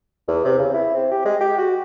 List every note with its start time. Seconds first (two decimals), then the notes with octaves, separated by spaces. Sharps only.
0.28 E2
0.45 C3
0.59 C#3
0.74 E4
0.94 C4
1.11 G4
1.25 G#3
1.41 G4
1.58 F#4